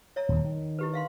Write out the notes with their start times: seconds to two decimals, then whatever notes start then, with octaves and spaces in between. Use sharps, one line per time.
0.16 C#5 E5 A#5
0.29 D#1 D#2
0.44 D#3
0.79 E4 G4 B4
0.93 E5 F5 C6